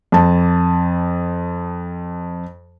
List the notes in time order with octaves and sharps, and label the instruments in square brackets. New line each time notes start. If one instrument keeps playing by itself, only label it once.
[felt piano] F2 A5